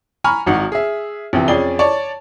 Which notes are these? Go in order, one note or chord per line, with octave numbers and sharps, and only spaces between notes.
G#5 A#5 B5 C#6 F6
G#1 D#4 F#4 F#5
G#4 E5
A#1 C3 E3
F2 C#4 G#4 D5 G7
C#5 D5 A5 C#6